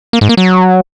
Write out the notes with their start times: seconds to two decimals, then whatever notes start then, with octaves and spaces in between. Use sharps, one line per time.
0.13 A#3
0.21 G#2
0.29 A#3
0.37 F#3